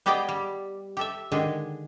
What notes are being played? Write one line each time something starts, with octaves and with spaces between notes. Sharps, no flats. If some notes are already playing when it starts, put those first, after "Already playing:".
B3 G4 G#4 D5 D#5 G5
G3
G4 A4 E5
D3 D#3 G#3 G4 G#4